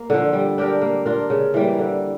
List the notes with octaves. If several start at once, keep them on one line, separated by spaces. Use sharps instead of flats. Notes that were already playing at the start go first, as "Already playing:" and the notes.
Already playing: A#3
D3 F3
G3
D4 G4 A#4
A#3
D4 F4 A#4
C#3
E3 G3 A#3
D3